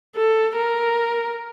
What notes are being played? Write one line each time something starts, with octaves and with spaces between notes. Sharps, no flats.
A4
A#4